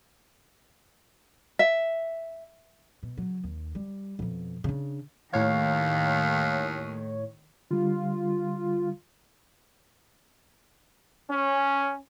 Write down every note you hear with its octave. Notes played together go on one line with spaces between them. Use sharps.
E5
B2
C#3 F#3
D#2
G3
F2 B2
C#3 D4
D#2 A2 D#3 C#5 F5
D3 G3 F4
C#4